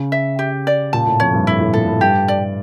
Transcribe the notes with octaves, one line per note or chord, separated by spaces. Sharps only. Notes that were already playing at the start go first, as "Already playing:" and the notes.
Already playing: C#3
E5
G4
D5
A#2 A5
A2
F2 C#5
G2
A2 E4
A2
A#2 A4
A2
G2 G4
D5